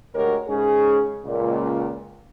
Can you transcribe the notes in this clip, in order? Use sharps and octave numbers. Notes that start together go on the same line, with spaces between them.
D2 G#3 F#4 G4 A#4 C#5
G#2 C#3 C#4 G#4
C#2 A#2